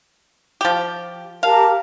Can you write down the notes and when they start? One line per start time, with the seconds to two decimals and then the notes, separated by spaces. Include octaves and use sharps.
0.61 F3 G4
1.43 G4 A#4 F5 A5